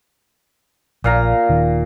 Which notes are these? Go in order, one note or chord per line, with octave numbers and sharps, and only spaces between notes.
A#1 A#2 F5 A#5
D#1 D#3